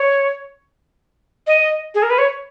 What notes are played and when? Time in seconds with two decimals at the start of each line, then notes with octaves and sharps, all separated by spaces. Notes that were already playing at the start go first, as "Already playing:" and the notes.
Already playing: C#5
1.47 D#5
1.95 G#4
2.03 A#4
2.10 B4
2.18 C#5